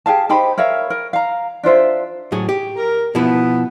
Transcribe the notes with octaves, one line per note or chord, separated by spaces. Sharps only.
G4 G#4 F5 A5
D#4 G4 C5 B5
A#4 C#5 E5 F5
A#4
F5 A#5
D4 F4 C5 E5
A2 F#3 G#4
G4
A#4
B2 F3 B3 E4